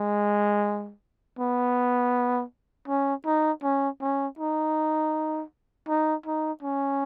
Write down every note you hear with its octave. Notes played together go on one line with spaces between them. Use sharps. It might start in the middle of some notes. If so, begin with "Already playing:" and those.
Already playing: G#3
B3
C#4
D#4
C#4
C#4
D#4
D#4
D#4
C#4